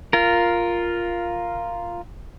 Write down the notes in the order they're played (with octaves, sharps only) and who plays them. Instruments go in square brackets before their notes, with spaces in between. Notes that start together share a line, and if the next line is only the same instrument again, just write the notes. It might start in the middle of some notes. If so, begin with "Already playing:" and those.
[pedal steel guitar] F4 A#4